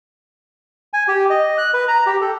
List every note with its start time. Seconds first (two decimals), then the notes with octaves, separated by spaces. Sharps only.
0.93 G#5
1.08 G4
1.30 D#5
1.58 F#6
1.74 B4
1.88 A#5
2.06 G4
2.21 A4